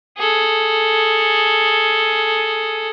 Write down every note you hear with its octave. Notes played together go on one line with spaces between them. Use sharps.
G#4 A4